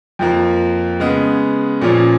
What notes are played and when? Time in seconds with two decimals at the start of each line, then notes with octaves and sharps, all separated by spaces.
0.19 F2 F3 A#3
1.00 C#3 G#3 B3
1.82 A#2 F3 A#3 C#4